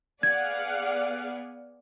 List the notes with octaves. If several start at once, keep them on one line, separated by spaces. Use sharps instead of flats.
B3 G#4 D5 F5 F#5 G#5 G#6